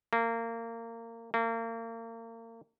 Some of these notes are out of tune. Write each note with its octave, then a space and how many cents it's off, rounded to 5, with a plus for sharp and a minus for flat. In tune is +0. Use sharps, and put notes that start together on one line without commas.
A#3 -25
A#3 -35